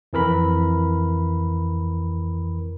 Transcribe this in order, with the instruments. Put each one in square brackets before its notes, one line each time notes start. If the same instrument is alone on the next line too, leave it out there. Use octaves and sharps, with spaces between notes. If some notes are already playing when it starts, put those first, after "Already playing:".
[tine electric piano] F2 E3 A#4 B5